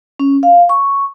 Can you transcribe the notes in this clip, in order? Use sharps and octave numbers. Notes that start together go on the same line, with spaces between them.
C#4
F5
C#6